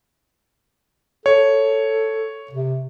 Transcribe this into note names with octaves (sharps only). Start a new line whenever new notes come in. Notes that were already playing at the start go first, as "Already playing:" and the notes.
A4 C#5
C3